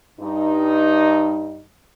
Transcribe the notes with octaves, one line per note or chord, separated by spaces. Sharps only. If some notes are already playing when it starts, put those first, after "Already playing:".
G2 D#4